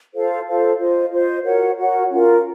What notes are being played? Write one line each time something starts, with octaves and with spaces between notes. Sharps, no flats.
F4 A4 C5 F5
F4 A4 C5 F5
F4 C5 D#5
F4 C5 D#5
F#4 A#4 C#5 F#5
F#4 A#4 C#5 F#5
C#4 F4 A#4